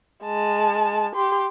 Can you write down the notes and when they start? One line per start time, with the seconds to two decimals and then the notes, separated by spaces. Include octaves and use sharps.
0.24 G#3 A5
1.15 G4 C6